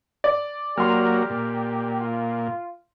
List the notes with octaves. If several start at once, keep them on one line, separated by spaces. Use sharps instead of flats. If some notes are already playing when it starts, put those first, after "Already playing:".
D5
F#3 A#3 G4 C6 F6
A#2
F4